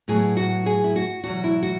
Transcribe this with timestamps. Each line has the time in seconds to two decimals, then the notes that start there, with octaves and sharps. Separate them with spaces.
0.08 A2 F#3 B3 G#4
0.37 F#4
0.66 G#4
0.84 E4
0.96 F#4
1.23 E2 B2 F#3 F#4
1.44 E4
1.63 F#4